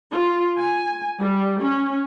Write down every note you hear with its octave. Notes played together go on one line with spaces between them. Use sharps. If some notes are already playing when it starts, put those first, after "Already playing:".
F4
G#5
G3
C#4